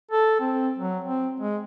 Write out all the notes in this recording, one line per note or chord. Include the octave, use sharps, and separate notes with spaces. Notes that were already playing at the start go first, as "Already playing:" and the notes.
A4
C4
F#3
C4
G#3